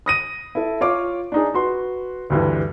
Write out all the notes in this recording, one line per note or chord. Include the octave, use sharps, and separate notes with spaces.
D#6 A#6 D#7
E4 A4
F4 C#5 F5 D6
D4 D#4 G#4
F#4 B4 C6
D2 G2 E3